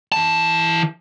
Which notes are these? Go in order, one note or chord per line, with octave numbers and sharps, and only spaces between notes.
E3 A5